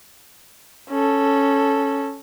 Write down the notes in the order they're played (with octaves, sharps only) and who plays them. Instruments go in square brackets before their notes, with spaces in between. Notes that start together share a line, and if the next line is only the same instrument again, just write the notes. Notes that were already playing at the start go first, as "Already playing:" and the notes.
[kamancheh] C#4 A4